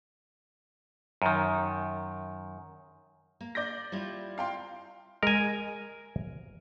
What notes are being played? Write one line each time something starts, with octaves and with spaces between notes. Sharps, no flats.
F#2 D#3
A#3
D5 G6 A#6
G3 E4 F4
F5 G5 C6
G#3 A#4 G#5